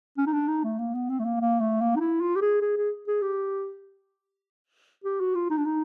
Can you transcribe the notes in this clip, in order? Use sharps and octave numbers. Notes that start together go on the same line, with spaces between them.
C#4
D#4
D4
D#4
A3
A#3
B3
C4
A3
A#3
A#3
A3
A#3
D#4
E4
F4
G4
G#4
G#4
G#4
G#4
G4
G4
F#4
F4
D#4
D4
D#4